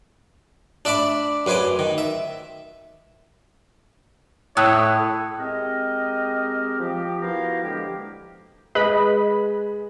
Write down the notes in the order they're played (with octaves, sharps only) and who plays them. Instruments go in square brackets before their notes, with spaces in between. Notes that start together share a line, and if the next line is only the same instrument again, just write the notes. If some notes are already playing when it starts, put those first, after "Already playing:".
[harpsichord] D4 D5 E5 B5 D6
F#2 B4 C5 G#5 D6
D#3
E5
[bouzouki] A2 [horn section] E4 C#5 [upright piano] D#6 E6 F#6
[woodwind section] G#3 C4 G4 A#4 D#5
F3 G4
B3 E4 F#4 G4 A#4 F5
D3 F3 G#3 A#3 G4
[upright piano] G#3 [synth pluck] B4 D#5 B5